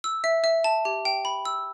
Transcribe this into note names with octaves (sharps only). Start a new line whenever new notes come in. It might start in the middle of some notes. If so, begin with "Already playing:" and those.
E6
E5
E5
A5
G4
G5
B5
E6